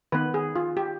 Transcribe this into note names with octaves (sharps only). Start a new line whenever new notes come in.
D#3 B3 B4
G#4
F4
G4